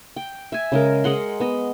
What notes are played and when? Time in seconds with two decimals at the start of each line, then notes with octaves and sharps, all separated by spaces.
0.16 G5
0.52 E5 G#5
0.72 C#3 G#3 A#4
1.04 G#3 D#5 F#5 C6
1.40 B3 D#5